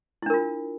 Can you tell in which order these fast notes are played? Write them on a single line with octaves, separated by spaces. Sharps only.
E4 D4 A#4 F4